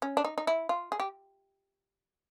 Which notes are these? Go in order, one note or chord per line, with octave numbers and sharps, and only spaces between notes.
C#4
D4
D#4
D#4
E4
F4
G#4
G4